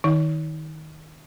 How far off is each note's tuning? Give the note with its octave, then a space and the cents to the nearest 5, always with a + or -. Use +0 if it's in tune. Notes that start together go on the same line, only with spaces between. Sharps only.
D#3 +0 D#4 +45